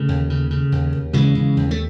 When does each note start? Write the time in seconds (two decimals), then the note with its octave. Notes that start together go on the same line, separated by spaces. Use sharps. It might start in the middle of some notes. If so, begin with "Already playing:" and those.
Already playing: C#3 A3
0.09 D#2
0.30 C#3
0.51 C#3
0.72 D#2
0.93 D#2
1.13 C#3 E3 G#3
1.35 C#3
1.57 D#2
1.71 A3